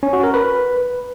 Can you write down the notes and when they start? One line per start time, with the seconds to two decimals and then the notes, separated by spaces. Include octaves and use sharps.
0.03 C#4
0.13 F#4
0.23 A#4
0.34 B4